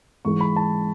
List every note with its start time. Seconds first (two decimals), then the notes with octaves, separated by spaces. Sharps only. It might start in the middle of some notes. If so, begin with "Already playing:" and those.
0.25 G#2 E3 G#3 C#6
0.41 B5
0.56 A5